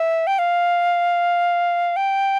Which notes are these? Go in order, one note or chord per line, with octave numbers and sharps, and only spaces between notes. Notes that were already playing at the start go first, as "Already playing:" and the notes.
Already playing: E5
G5
F5
G5